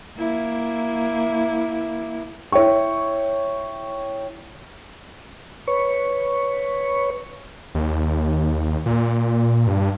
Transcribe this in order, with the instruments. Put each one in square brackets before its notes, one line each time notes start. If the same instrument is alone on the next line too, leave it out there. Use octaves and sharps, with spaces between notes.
[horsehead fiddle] A#3 E4
[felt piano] E4 C#5 E5 G5 C#6
[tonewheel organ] B4 C#5 C#6
[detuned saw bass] D#2
A#2
G2